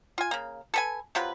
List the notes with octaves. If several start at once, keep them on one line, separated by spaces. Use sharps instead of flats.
F4 G#5
C#3 A#3
A4 B4 G#5
C3 F#3 F4 B4